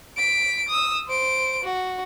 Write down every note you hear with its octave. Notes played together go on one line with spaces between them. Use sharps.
B6 D7
D#6 E6
C5 D7
F#4